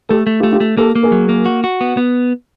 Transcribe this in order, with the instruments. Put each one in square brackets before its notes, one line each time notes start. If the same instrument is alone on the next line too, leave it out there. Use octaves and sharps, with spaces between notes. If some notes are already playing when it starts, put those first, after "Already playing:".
[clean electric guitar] A3 [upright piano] G4 A4
[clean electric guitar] A3
[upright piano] F4 G4
[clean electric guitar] A3
[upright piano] F4 G4
[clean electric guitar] A3
[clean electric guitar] A#3 [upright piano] G4 A4
[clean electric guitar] A#3
[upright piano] G#4 A#4
[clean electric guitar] F#3
A#3
F#4
F#4
B3
B3